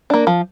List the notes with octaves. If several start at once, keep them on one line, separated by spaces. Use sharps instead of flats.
A#3 D4
F3